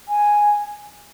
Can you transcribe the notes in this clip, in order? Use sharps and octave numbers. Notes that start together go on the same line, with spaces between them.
G#5